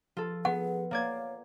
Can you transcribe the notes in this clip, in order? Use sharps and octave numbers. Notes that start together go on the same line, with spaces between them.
F3 F4 A4
B3 G#4 F#5
A#3 C#5 D5 F5 G#6